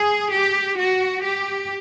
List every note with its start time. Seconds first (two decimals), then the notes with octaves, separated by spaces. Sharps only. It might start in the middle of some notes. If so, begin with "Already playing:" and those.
Already playing: G#4
0.33 G4
0.78 F#4
1.23 G4